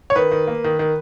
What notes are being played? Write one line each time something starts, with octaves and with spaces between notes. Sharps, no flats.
C#5
D#3 B4
D#3
A#3
D#3
D#3